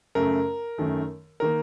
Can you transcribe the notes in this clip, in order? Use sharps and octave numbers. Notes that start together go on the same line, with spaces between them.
F#2 C#3 A3 A#4
F#2 D#3 A3
D#3 A#3 A#4